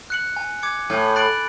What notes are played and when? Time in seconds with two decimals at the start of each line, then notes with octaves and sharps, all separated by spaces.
0.10 F#6 C#7 F#7
0.36 G#5
0.63 D6 G#6 C#7
0.90 A2 G#5
1.16 B5 F#6 A6 D7